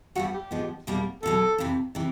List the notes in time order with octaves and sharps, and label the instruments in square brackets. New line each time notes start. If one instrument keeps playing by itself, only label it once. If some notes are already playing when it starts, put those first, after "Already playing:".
[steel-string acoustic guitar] G2 D3 G3 B3 [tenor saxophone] F#4
[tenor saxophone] G4
[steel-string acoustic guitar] G#2 F3 G#3 B3
E2 B2 G3 A#3
[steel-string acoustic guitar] E2 B2 F#3 [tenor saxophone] A4
[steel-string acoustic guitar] F2 C3 E3
C3 E3